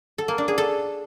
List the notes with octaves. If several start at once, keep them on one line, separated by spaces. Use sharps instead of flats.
A4
A#3
D4
G#4
A4